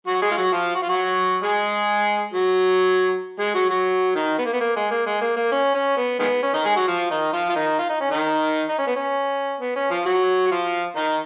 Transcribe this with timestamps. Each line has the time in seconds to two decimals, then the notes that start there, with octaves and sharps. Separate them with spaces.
0.07 F#3 F#4
0.22 G#3 G#4
0.31 F4
0.37 F#3 F#4
0.52 F3 F4
0.75 F#4
0.82 F4
0.89 F#3 F#4
1.43 G#3 G#4
2.34 F#3 F#4
3.40 G#3 G#4
3.55 F#3 F#4
3.69 F#3 F#4
4.15 D#3 D#4
4.38 B3
4.46 A#3
4.53 B3
4.60 A#3
4.76 G#3
4.91 A#3
5.07 G#3
5.21 A#3
5.36 A#3
5.51 C#4
5.74 C#4
5.97 B3
6.19 D#3 G#3 B3
6.43 C#4
6.54 D#3 D#4
6.65 G#3 G#4
6.76 F#3 F#4
6.88 F3 F4
7.11 D#3 D#4
7.33 F3 F4
7.49 F4
7.56 D#3 D#4
7.78 F4
7.89 D#4
8.01 C#4
8.11 D#3 D#4
8.69 D#4
8.78 C#4
8.87 B3
8.96 C#4
9.60 B3
9.75 C#4
9.90 F3 F4
10.05 F#3 F#4
10.46 F#4
10.51 F3 F4
10.96 D#3 D#4